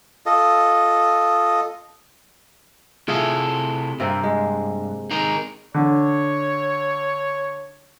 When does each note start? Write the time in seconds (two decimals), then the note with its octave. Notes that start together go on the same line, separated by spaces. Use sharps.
0.26 F4 A4 D#5
3.08 C3 A3 E4 F4 G#4 A4
4.00 G2 C3 A#3 C4
4.23 G#3
5.11 D#4 G#4 A#4
5.74 D3 C#5